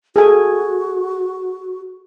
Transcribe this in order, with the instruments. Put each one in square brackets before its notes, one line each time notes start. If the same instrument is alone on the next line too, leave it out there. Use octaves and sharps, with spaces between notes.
[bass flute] F#4 [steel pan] G#4 A4 G#5